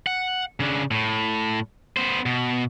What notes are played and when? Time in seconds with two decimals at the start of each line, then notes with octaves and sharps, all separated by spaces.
0.07 F#5
0.60 C#3 D4
0.91 A2
1.97 B3 C5
2.26 B2